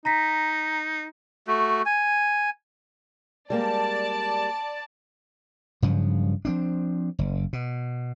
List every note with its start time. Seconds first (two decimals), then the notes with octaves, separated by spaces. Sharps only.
0.05 D#4 A#5 A#6 B6
1.47 A3 F#4
1.86 G#5
3.50 G3 G#3 A#3 D5 A5
5.82 G2 C#3 F3 F#3
6.45 F3 C4 D4
7.19 F#1
7.53 B2